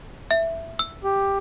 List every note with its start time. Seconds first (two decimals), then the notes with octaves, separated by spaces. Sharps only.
0.31 E5
0.79 E6
1.04 G4